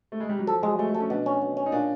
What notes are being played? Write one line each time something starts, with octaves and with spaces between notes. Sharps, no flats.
A3
G#3
G3
F#3
F3 A4
F#3 G#3
G#3 A3
A3
A4
C#4
B2 D4
C#4
B2
C#4
D#4
A#2 D4